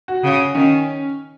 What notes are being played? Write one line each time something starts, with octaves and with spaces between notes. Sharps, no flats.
F#4
C#3
D#3 C#4